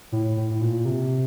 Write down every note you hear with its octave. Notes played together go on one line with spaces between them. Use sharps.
A2
A2
A2
A#2
C3